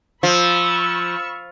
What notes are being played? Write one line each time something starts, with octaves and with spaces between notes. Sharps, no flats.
F3 B5 C#6 E6